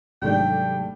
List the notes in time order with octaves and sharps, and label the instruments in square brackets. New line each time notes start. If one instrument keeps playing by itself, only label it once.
[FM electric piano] G#1 G#2 [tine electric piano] C3 F#3 [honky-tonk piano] G3 A3 D4 [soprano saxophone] G5